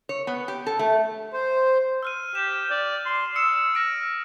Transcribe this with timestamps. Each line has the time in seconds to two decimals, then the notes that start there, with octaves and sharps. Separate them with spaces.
0.09 C#5
0.27 B3
0.48 G4
0.66 A4
0.79 A3
1.33 C5
2.03 E6 F6 D#7
2.35 G4 E7
2.70 D5
3.05 C6
3.35 D#6 E6 C#7 E7
3.75 F6 A#6 D7